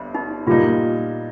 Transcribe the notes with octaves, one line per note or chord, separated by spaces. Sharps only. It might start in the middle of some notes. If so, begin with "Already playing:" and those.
Already playing: G1 G2
D#4
A#2 G3 A#3 D#4 F4